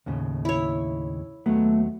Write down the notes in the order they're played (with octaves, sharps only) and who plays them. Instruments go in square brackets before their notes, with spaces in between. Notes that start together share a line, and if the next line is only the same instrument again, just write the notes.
[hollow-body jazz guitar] D#2 A2 C#3
[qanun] E4 C#5
[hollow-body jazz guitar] D#2 F#3 B3 [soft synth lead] A3